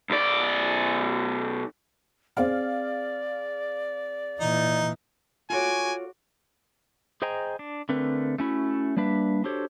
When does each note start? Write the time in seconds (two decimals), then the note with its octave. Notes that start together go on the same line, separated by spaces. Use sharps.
0.10 B1 D5
2.37 C4 G#4 D5 F5
4.40 A#2 E3 D#4
5.50 F4 F#4 A4 C#5 G#5 D6
7.22 G#4 C5 D#5 G5 G#5 A#5
7.59 D4
7.89 D3 A3 C4 A#4 B4
8.38 A3 C#4 E4 F#4
8.97 G3 A#3 D4 B4 E5
9.44 D4 F#4 G4 A4 C5 C#5